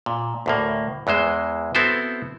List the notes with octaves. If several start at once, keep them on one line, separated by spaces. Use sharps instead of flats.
A#2
D2 A2 A#3
E2 E3 G#3 C5
B3 C4 E4 F#4 A4 C5